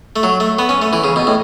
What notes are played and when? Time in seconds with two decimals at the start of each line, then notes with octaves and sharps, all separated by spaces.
0.16 A3
0.23 F#3
0.40 A3
0.59 B3
0.69 C#4
0.82 A3
0.93 E3
1.04 C#3
1.16 B2
1.27 A2